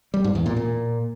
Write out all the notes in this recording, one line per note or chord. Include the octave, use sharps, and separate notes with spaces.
G3
G#2
E2
A#2
A#2